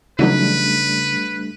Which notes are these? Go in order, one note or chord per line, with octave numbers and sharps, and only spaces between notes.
C#3 E3 F#3 G3 A3 D4 D#4 B4